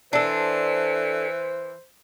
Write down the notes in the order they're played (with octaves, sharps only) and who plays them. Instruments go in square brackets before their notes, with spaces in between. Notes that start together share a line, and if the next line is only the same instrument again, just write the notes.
[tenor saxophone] E3 [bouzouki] D4 A4 [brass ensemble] C5